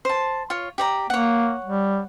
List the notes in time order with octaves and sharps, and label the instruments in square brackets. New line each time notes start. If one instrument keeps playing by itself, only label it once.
[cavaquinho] C5 A5
F4 C#5
G4 D5 A#5
[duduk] A#3 [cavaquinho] C#5 F#5
[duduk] G3